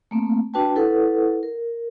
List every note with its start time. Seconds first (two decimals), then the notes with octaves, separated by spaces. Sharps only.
0.11 A3 A#3 C4
0.54 D4 F#4 B4 G5 A5
0.75 E4 A4 B4 F#5
1.43 A#4